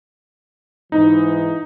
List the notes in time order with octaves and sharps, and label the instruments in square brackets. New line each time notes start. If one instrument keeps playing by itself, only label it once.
[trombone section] G#2 E3 [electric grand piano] D#4